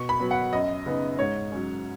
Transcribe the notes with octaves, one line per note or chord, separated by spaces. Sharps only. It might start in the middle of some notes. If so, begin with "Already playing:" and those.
Already playing: B2 C#6
B5
F#3 B3
F#5
F#2 D#5
C#3 B3 D#4
G#2 C#5
F#3 C#4